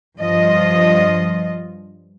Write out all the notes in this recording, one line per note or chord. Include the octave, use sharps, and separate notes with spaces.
G2 F3 F4 D#5